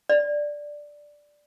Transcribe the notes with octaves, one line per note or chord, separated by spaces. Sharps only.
D5